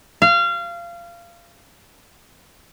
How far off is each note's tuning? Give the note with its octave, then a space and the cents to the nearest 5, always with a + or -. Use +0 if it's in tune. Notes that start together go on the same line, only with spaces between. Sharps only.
F5 -25